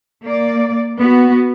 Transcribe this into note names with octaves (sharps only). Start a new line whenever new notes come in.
A#3 D5
B3 F#4